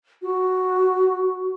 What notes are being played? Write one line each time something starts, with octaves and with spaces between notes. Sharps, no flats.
F#4